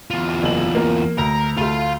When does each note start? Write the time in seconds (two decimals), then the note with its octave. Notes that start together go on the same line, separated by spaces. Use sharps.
0.11 E2 F4
0.43 F#1 F#7
0.75 A#3 A#4
1.18 D2 A#4
1.57 D2 A3 F4 C6